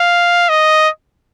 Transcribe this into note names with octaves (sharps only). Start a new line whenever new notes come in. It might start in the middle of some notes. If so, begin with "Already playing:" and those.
Already playing: F5
D#5